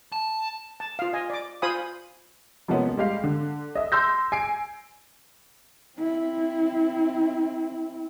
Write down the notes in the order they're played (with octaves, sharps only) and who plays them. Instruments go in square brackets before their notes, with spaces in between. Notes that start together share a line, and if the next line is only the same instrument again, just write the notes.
[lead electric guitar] A5
[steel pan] A5
F4 F5
D#5 G#5
D5 D6
F4 C5 F5 G#5 B5 D#6
[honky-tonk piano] C3 F3 G#3 A#3 B3 C#4
G3 G#3 G4 F5
D3
D#5 E5
C6 E6 G6 A#6
G#5 C7 D7
[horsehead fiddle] C4 E4